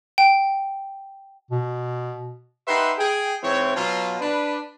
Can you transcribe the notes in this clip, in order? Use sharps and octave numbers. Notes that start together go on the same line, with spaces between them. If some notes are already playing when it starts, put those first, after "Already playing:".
G5
B2
D#4 G4 B4 E5 F#5 C6
G#4 G5
G#2 E3 C4 E4 C#5
B2 F#3 F4
D4 B4